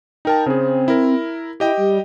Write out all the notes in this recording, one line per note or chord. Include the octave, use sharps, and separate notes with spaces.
D#4 A#4 G5 A5
C#3 C4 G#4
E4 A#4
E4 G4 D#5 G5
G3